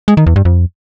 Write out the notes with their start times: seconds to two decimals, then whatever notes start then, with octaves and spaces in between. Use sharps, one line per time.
0.08 G#3
0.17 D#3
0.27 E2
0.36 G2
0.45 F2